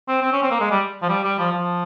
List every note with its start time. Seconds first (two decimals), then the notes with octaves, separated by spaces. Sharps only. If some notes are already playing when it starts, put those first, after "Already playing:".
0.08 C4
0.22 C4
0.33 C#4
0.43 C4
0.51 A#3
0.60 G#3
0.71 G3
1.02 F3
1.09 G3
1.23 G3
1.39 F3
1.52 F3